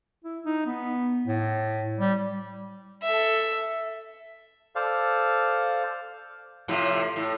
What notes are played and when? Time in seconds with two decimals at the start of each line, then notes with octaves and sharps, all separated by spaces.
0.24 E4
0.45 D#4
0.66 B3
1.27 A2
2.00 G3
3.03 A4 E5
4.75 A4 C5 D5 F5
6.68 A2 C3 F3
7.16 A2